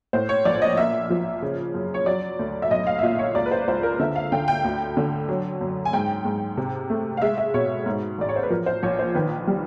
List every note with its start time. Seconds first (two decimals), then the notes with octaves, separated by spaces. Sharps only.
0.13 A2 C5
0.29 C#5
0.45 A#1 D5
0.62 D#5
0.77 A#3 E5
1.10 F3
1.42 C#3
1.74 F#2
1.94 C#5
2.06 F#3 D5
2.39 D2
2.62 E5
2.71 B1 D#5
2.87 F5
2.99 E5
3.03 A#2 D#5
3.19 C#5
3.35 C#2 D5
3.46 B4
3.52 C5
3.67 C#2 C5
3.83 A#4
3.99 D3 E5
4.16 F5
4.32 D3 G5
4.48 G5
4.64 D2
4.97 D3
5.29 F#3
5.61 F#2
5.85 G#5
5.93 G#2 G5
6.25 G#2
6.57 C3
6.90 A3
7.17 F5
7.22 G#3 E5
7.38 E5
7.54 B2 C#5
7.86 G#2
8.18 A1 D5
8.29 C#5
8.36 C5
8.43 B4
8.50 F3 A#4
8.66 C5
8.83 A#1 C#5
8.99 C5
9.15 D#3 B4
9.47 G3